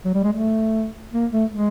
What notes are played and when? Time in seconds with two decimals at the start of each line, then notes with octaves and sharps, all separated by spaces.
0.05 F#3
0.14 G3
0.23 G#3
0.32 A3
1.13 A#3
1.32 A3
1.50 G#3